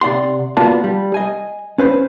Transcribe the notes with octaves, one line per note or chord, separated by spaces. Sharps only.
C3 D5 F#5 C6
A#3 B3 F4 F#4 D5 A5
G3
D#5 G#5
C#4 B4 C5